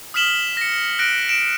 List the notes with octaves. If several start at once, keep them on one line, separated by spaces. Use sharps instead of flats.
D#6 F6 B6 E7 F#7 G7
A#6 C#7
F#6 A#6 D7
D7 E7